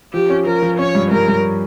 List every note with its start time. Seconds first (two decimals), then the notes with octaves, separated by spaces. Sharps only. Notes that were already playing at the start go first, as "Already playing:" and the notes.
0.13 F3 G4
0.30 C#4
0.46 F3 A#4
0.63 F3
0.79 C#4 C#5
0.95 G2
1.11 G2 A#4
1.28 G2